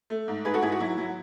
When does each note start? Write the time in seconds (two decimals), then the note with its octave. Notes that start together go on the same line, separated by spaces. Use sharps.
0.10 A3
0.28 G#2
0.45 G#2 G#4 B4
0.54 F#4 A4
0.62 G#2 E4 G#4
0.72 F#4
0.80 F#3 E4
0.98 F#3